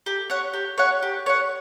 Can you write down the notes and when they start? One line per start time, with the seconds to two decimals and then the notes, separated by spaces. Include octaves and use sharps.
0.06 G4
0.30 C#5 F#5
0.54 G4
0.78 C#5 F#5
1.03 G4
1.26 C#5 F#5